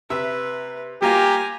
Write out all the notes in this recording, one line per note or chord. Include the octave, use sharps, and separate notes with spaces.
C3 B4 E5 E6
G3 A#3 F4 G4 G#5 A#5